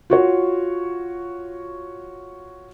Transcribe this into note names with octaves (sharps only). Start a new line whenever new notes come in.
F4 F#4 C#5